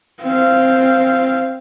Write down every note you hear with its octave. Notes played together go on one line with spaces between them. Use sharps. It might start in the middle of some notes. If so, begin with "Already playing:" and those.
C4 F5